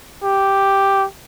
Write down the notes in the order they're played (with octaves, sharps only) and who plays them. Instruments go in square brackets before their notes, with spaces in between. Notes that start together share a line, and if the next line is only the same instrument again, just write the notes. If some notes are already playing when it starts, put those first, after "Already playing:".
[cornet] G4